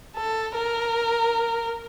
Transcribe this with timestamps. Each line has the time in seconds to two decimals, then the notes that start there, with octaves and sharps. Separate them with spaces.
0.15 A4
0.55 A#4